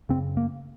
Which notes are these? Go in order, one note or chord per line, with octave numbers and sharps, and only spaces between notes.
F#2 C#3 C4
A#3